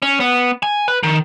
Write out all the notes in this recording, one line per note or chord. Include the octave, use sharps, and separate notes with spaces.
C#4
B3
G#5
B4
D#3